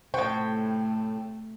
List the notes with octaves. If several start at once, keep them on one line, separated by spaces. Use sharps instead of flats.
A2 C3 A3 C5 F#5 G5 C#6